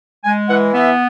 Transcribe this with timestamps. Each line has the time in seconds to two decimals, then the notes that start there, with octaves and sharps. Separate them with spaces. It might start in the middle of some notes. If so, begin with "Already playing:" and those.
0.24 G#3 G#5
0.49 E3 F#5
0.74 B3 E5